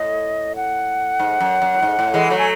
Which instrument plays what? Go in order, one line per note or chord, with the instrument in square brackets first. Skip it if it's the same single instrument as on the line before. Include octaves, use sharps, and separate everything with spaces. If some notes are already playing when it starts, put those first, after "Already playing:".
Already playing: [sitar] A2 [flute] D#5
[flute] F#5
[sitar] G#2
F#2
F#2
A2
G#2
A2
E3 G#3
F#3 A3
[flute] G#5